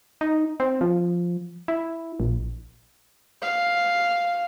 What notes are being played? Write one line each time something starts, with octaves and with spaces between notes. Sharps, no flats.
D#4
C4
F3
E4
A#1
F5